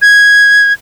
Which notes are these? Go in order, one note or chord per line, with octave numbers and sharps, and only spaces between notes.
G#6